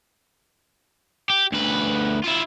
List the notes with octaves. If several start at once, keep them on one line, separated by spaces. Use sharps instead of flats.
G4
D2 B4
E4 F4